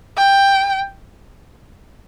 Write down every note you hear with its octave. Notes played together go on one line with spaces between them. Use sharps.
G5